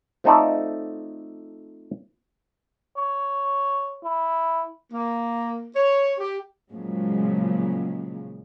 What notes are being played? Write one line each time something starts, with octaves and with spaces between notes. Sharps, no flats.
F3 A3 C4 D#4 A4 D5
C#5
E4
A#3
C#5
G4
A#2 C#3 F3 F#3 G#3